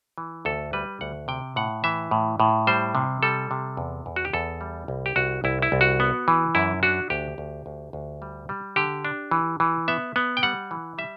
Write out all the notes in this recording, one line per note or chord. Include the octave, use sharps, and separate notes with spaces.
E3
D2 A4
G3 B4
D2 F#5
C3 G5
A2 F#5
E3 E5
A2
A2
G3 C5
C3
G3 A4
C3
E2
E2
F#4
G4
E2 A4
G3
C2
G4
C2 F#4
C2 E4
E4
C2
F#4
B3
E3
F#2 E4
D4 F#4
D2 G4
D2
D2
D2
G3
G3
D3 G4
D4
E3
E3
B3 E5
B3
G5
G3 F#5
E3
G3 E5